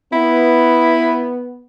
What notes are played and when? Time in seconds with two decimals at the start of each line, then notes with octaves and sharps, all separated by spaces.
0.13 B3 E4